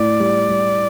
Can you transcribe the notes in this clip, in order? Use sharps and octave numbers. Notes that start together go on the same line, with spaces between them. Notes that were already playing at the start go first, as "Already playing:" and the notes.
Already playing: A2 E4 D5
G3
G3